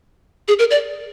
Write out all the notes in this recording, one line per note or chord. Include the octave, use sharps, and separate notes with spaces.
G#4
A#4
D5